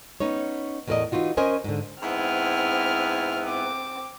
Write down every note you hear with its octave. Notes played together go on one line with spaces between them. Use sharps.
B3 C#4 D#4 C#5
E2 A2 B3 A#4 D5 D#5
E3 D#4 F4 F#4
C#4 A#4 C5 D#5 G#5
G#2 D3
G#2 B3 C4 E4 F6
C4 D6